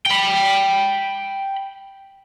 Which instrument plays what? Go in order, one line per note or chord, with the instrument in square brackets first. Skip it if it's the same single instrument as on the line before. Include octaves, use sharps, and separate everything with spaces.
[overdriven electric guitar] G5 B5